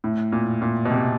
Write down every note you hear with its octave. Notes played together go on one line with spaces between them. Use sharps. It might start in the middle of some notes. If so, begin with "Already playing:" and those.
A2
A#2
A#2
B2
C3